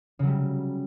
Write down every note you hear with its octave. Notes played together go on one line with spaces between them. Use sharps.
C#3 F#3 G3